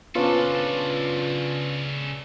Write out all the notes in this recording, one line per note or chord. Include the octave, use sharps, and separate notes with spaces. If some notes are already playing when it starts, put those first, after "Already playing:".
C#3 B3 C#4 D4 F4 A4 B4 F5